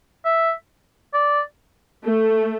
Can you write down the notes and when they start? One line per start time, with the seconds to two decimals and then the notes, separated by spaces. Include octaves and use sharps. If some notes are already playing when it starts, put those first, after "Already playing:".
0.25 E5
1.14 D5
2.03 A3